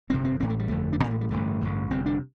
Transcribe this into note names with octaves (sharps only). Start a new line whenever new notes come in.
G1 F2 C3 C4
C4
A1 A2 C4
A3
G3
G1 F2 D3 A3
D4
A1 A2 C4
A3
G3
A1 G2 D3 A3
A1 G2 D3
G1 F2 C3 C4
D4